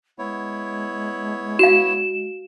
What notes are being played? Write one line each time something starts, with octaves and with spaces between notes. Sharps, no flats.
G#3 B3 E4 C#5
F#4 F5 E7